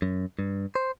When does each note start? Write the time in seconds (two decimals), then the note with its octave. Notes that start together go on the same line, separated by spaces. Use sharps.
0.02 F#2
0.39 G2
0.75 C5